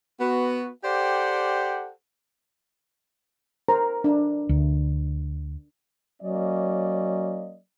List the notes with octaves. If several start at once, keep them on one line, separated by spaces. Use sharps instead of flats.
B3 F#4
G4 A4 C5 D5 F#5 G5
A#4 C5 A#5
D4
D2
F#3 A#3 C#4 D5 D#5